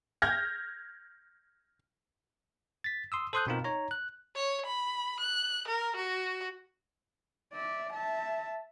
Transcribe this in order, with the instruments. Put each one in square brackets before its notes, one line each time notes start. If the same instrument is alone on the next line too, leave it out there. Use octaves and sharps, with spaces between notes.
[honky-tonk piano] F6 G6 G#6 A#6
[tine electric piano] A6 B6
C6 D#6 E6
A4 C5 C6 D#6 F#6 G6
B2 B3 C4 D#4 F4 A#4
D#4 C#5 A#5
F#6
[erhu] C#5
B5
F#6
A#4
F#4
[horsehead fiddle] D5 E5
E5 A5